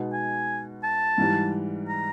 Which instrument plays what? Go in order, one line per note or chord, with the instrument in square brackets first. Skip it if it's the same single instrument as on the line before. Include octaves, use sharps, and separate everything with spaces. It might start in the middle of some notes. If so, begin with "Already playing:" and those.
Already playing: [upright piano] B2 G#3 B3 D#4 F#4
[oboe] G#5
A5
[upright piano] G#2 E3 G3
[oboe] A#5